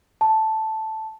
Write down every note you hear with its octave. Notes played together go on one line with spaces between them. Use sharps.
A5